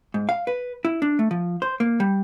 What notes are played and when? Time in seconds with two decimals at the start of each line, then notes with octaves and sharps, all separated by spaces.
0.14 G#2
0.29 F5
0.47 B4
0.85 E4
1.02 D4
1.19 A3
1.31 F3
1.62 C5
1.80 A#3
2.00 G3